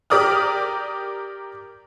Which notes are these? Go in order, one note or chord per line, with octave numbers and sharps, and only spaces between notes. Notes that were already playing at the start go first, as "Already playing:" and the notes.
G4 A#4 D5 D#6 F6